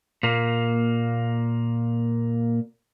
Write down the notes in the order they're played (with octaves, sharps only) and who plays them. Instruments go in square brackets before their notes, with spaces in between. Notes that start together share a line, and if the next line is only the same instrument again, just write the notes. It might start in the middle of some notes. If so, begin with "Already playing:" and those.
[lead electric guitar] A#2 A#3